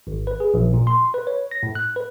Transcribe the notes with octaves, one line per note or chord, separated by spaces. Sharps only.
G#1
B4
G#4
A#1
A#2
C6
B4
C#5
A#6
A2
F#6
B4